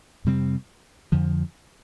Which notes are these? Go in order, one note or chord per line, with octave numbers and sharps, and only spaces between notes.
F2 C3 G3 C4
F2 D3 F3